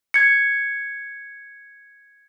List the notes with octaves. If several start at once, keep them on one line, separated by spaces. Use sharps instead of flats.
G#6 C#7